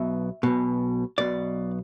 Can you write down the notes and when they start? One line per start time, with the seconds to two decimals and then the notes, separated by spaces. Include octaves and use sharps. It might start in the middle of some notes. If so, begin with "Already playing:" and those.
Already playing: B1 B2 E5
0.43 B1 B2
1.18 B1 B2 D5